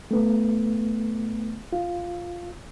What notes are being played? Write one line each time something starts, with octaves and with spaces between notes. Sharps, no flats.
A3 B3
F4